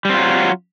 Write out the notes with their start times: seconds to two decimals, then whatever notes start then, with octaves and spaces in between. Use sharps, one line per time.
0.05 G3
0.10 C4
0.14 F4
0.19 F#3